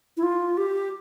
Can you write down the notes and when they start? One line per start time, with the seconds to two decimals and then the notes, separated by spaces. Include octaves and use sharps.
0.17 E4
0.23 F4
0.57 G4